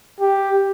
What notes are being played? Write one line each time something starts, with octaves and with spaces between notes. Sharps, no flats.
G4